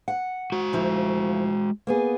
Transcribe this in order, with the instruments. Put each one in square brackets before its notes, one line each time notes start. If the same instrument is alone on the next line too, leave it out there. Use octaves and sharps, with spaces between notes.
[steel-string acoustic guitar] F#5
[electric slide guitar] G#3 F#4
[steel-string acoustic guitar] D2 F3 E4
A#3 B3 G#4